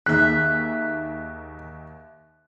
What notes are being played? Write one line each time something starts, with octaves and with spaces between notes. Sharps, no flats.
D#2 D#3 G#4 E5 F#6 B6